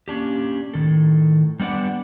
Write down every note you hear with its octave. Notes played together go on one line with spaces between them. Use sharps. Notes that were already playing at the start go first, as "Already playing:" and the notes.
A#3 C#4 D4 G4
A2 D#3 A4
G3 B3 D4 D5 F#5